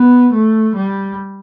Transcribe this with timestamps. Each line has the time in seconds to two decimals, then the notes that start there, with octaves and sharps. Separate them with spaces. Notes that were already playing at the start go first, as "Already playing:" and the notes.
Already playing: B3
0.33 A3
0.76 G3